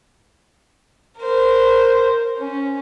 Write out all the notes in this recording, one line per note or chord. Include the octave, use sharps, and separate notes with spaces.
A#4 C5
C#4